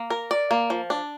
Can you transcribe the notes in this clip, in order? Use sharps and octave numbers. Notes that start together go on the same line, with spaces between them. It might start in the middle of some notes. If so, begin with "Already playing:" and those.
Already playing: A#3
A#4
D5
A#3
F3
D4